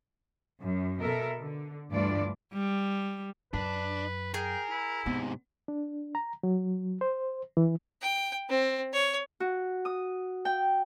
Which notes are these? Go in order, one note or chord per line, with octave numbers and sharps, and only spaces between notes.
F#2
B2 A4 A#4 E5
D3
D2 G2 E3 D4 F4 D5
G3
F#2 D4 B4
G#4 A#4 G5
E4
G#2 C3 B3
D4
A#5
F#3
C5
E3
G5
C4
C#5
F#4
D#6
G5